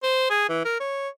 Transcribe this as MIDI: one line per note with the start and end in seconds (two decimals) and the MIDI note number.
0.03 0.29 72
0.30 0.47 68
0.49 0.61 52
0.65 0.77 70
0.80 1.09 73